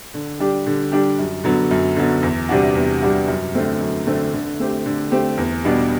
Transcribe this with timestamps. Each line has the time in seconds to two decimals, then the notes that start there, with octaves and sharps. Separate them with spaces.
0.14 D3
0.40 G3 D4 G4
0.66 D3
0.92 G3 D4 G4
1.19 F#2
1.44 D3 F#3 B3
1.71 F#2
1.96 D3 F#3 B3
2.23 E2
2.49 C3 G3 D4 F#4
2.75 E2
3.02 C3 G3 D4 F#4
3.28 F#2
3.55 D3 A3 C4
3.81 F#2
4.07 D3 A3 C4
4.34 D3
4.59 A3 C4 G4
4.86 D3
5.11 A3 C4 G4
5.38 E2
5.64 B2 G3 B3 D4